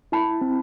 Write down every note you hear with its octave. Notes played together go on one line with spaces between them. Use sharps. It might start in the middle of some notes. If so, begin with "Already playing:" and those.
E4 A5 B5
C4